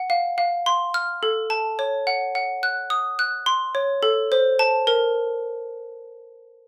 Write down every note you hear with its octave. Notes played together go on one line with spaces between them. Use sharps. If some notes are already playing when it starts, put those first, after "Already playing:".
Already playing: F#5
F5
F5
C6
F6
A4
A5
C#5
F#5
F#5
F#6
D#6
F#6
C6
C#5
A4
C5
A5
A#4